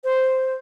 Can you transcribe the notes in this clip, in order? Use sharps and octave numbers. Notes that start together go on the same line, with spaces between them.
C5